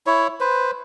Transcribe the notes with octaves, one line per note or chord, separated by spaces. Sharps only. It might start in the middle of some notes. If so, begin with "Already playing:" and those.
E4 C#5
B4 C5